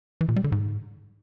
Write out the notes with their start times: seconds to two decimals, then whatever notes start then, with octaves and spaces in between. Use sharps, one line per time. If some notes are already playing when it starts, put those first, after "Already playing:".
0.21 E3
0.29 A#2
0.36 G3
0.44 D3
0.52 G#2